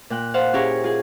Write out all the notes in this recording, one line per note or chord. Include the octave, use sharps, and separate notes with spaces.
A#2 G5 F#6
C5 F5 F#5
C#4 E4 G4 G#4 A#4 C#5
F4 G#4